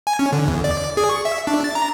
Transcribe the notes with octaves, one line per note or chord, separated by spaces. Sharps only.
G#5
C#4
D3
E2
D5
G#4
C#6
E5
D4
A6
A#5